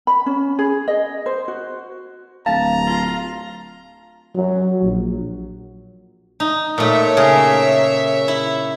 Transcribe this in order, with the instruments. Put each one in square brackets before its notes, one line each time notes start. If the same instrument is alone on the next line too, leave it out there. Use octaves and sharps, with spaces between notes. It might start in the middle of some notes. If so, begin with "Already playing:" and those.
[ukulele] B5
C#4
G#4
D#5
C5
F#4
[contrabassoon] D1 [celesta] F5 [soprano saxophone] A5 [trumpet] A#5
[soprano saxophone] F4
[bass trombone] F#3
A#1
[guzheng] D#4
[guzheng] A#2 A3 [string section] C#5 E5
[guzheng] C#3 G#4 A#4
E4